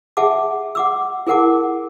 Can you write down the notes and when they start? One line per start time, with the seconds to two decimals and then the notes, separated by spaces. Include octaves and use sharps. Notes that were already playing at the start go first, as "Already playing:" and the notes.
0.17 G#4 E5 F#5 A5 D6
0.75 F#5 D6 E6
1.27 E4 G#4 A#4 F#5 A5 D6